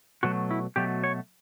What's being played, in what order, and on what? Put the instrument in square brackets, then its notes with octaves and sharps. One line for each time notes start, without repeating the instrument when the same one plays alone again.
[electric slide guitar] B2 F#3 A3 F#4
E4
B2 F#3 A3 G4
C#5